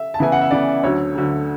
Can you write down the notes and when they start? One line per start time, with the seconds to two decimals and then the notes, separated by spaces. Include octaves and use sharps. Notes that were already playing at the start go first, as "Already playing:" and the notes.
Already playing: E5
0.14 A5
0.19 C#3 E3 B3 E4 G#5
0.32 F#5
0.41 E5
0.51 C#3 E3 B3 E4 D5
0.83 D2 D3 F#3 C#5
1.15 D2 D3 F#3